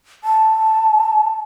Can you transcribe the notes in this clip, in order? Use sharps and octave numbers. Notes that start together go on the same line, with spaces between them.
A5